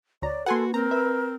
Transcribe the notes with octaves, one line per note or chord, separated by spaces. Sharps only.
D2 C#5 D5 A#5
A#3 F#4 A4 B4 F#5 G#5 C6
C4 A#4 A#5
B4 E5 E6